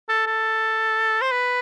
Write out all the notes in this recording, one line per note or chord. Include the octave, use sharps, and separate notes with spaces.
A4
A4
C5
B4